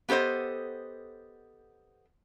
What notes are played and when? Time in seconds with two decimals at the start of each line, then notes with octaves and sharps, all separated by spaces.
0.09 B3 G4 A4 C5 D#5